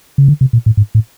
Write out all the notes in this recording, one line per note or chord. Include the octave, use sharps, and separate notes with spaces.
C#3
D3
C3
A#2
A2
G#2
A2